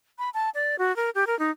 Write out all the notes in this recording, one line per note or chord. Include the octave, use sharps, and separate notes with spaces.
B5
A5
D5
F#4
A#4
G4
A#4
D#4